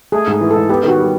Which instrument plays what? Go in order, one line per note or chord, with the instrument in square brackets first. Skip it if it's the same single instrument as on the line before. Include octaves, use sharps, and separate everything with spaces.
[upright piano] A3 [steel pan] G#4
[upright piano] G#2 [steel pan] G#4
[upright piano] E3
[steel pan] A4
[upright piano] G#2
[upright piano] B3 [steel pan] G4
[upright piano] D#3
[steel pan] F#4
[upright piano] G3